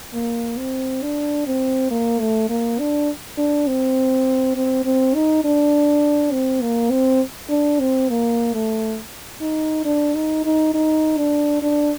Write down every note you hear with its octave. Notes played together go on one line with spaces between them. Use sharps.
A#3
C4
D4
C4
A#3
A3
A#3
D4
D4
C4
C4
C4
D#4
D4
C4
A#3
C4
D4
C4
A#3
A3
D#4
D4
D#4
D#4
D#4
D4
D4